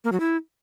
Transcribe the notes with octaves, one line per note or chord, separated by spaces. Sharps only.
A#3
F#3
E4